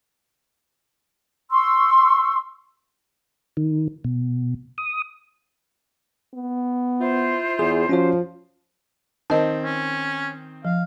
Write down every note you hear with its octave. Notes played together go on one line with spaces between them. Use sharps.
C6 C#6 E6
D#3
B2
D#6
B3
E4 F4 C5
E2 G#4
F3 C#4 F#4 C#5
D#3 C4 D#5 A5
C#4
F3 F5